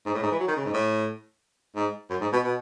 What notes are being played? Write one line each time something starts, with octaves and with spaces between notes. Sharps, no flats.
G#2
A2
G#2
E3
F#3
D#3
C#3
G#2
A2
G#2
F#2
G#2
B2
B2